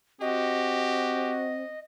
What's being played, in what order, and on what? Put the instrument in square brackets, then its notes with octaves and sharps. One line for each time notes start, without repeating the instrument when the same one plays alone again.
[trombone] C4 [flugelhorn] F#4 [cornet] G4 [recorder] D#5